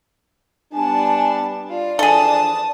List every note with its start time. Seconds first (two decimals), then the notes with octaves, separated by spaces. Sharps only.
0.73 G3 B3 D4 G#5 A5
1.70 F4 D5
1.99 E3 F3 D4 G#4 A4 A5 D#6